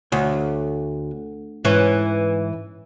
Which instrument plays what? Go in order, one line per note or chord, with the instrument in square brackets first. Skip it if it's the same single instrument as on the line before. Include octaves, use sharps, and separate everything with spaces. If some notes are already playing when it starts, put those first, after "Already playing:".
[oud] D2 [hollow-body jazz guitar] C#5
[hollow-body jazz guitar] G#2 [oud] E3 C#4